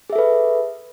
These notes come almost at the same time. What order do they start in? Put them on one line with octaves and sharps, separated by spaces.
G#4 E5 A4 B4